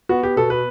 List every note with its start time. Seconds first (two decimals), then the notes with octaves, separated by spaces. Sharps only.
0.09 B3 F#4
0.23 G4
0.36 B2 A4
0.50 B4